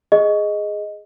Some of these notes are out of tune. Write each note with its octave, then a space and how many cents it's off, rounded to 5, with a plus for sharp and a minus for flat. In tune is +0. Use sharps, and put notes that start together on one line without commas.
G#4 +0 D#5 +0